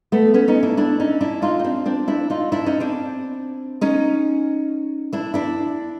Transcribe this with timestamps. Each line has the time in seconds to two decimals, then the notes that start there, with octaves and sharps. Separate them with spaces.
0.12 A3 B3
0.34 B3 C#4
0.48 C#4 D#4
0.63 D4 E4
0.77 D4 E4
1.00 C#4 D#4
1.21 D4 E4
1.42 D#4 F4
1.59 D#4
1.64 C4 D4
1.86 C4 D4
2.08 D4 E4
2.30 D#4 F4
2.52 D4 E4
2.66 C#4 D#4
2.80 C4 D4
3.81 C#4 D#4
5.13 D4 E4
5.34 D4 E4